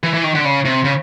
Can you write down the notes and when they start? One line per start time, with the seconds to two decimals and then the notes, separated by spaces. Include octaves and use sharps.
0.03 E3
0.14 E3
0.24 D#3
0.35 D3
0.45 C#3
0.65 C3
0.85 C#3